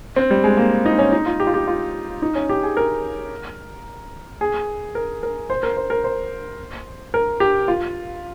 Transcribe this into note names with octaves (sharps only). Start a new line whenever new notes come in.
C4
G3
G#3
A#3
D#4
C#4
D#4
F4
G4
F4
G4
F4
D#4
C#4
G4
G#4
A#4
G#4
A#4
A#4
C5
A#4
C5
A#4
C5
A#4
G4
F4